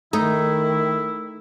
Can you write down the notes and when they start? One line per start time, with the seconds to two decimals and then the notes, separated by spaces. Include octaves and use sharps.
0.13 D#3 A3 D#4 E4